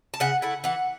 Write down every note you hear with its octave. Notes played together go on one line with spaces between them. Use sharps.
A5
C#3 F#5
A3 E4 F#5
E3 F#5